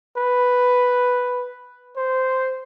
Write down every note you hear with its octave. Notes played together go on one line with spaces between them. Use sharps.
B4
C5